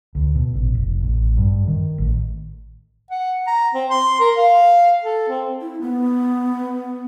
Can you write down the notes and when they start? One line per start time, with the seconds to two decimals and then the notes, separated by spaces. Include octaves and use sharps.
0.15 D2
0.35 B2
0.54 A1
0.75 F1
1.01 A1
1.37 G2
1.68 D#3
1.98 A1
3.11 F#5
3.47 A#5
3.75 C4
3.91 C6
4.20 A#4
4.36 F5
5.03 A4
5.29 C4
5.61 E4
5.81 B3